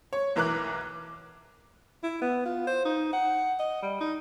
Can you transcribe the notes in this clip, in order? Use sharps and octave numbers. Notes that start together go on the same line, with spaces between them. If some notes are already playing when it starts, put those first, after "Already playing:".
C#5
B1 E3 A#4 D6 F#6
E4
B3
F4
C5
D#4
F#5
D#5
G3
D#4